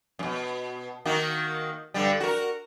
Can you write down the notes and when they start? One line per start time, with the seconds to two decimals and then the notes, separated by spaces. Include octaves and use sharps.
0.19 F#2 B2
1.05 D#3 A#3 F#4
1.94 G2 D3 G3
2.20 F#4 A#4